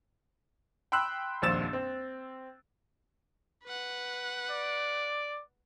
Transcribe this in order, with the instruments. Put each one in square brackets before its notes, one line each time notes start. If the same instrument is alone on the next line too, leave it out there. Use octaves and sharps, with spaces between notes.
[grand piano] G5 B5 C6 E6 F#6
D#1 A#1 F2 E6 A6 E7
C4
[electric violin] B4 F#5
[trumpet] D5